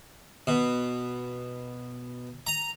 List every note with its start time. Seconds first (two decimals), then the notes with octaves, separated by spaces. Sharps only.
0.47 B2
2.47 A#5